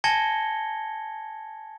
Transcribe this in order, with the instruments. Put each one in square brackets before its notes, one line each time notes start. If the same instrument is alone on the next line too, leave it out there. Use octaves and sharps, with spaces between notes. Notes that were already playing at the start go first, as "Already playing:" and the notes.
[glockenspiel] G#5 A5 G#6 A#6 C#7 G7